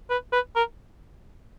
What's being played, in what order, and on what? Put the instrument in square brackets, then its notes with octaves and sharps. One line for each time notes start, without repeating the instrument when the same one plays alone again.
[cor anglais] B4
B4
A#4